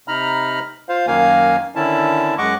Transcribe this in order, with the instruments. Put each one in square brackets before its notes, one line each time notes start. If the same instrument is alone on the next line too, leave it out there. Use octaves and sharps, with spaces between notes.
[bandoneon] C3 D#4 A#5 B5 F6
F4 C5 F5
F#2 D#3 A#3 F5 G#5
D3 D#3 C#4 E4 A5
F#2 G#3 D#5 F#5 C#6 D6